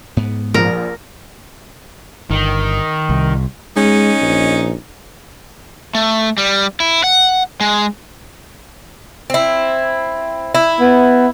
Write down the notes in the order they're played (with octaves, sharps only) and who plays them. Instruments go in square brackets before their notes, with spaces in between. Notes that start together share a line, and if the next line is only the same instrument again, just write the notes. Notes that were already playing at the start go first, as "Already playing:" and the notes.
[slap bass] G#2 B3
[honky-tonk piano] A#1 F3 [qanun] A#4
[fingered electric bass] G1 [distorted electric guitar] D#3
[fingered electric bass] C2
[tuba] G#3 [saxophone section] C#4 D#4
[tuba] A#1
[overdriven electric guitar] A3
G3
E4
F#5
G#3
[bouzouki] C4 E4
E4
[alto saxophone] B3